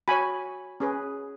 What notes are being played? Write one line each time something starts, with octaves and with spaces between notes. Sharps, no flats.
F#4 C#5 G#5 B5
C#4 G#4 B4